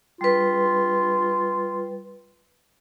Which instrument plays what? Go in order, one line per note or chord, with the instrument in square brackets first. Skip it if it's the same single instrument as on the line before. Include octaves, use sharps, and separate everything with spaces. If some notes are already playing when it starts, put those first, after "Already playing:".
[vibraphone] G3 B4 [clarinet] F4